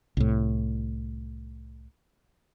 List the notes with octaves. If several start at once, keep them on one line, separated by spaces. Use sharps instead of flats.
C2 A2